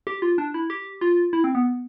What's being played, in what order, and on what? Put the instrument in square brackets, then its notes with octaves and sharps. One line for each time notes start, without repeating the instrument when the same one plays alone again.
[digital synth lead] G4
F4
D4
E4
G4
F4
E4
C4
B3